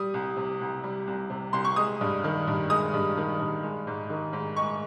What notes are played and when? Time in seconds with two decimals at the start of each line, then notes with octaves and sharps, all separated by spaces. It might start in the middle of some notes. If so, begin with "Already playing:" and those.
Already playing: G3 D#6
0.14 C2
0.37 C3
0.61 C2
0.84 G3
1.07 C2
1.30 C3
1.53 C2 C6
1.65 C#6
1.76 G#3 D#6
2.01 G2
2.24 D#3
2.47 G2
2.70 G#3 D#6
2.94 G2
3.17 D#3
3.40 G2
3.63 G#3
3.87 G#2
4.10 D#3
4.33 G#2
4.56 G#3 C#6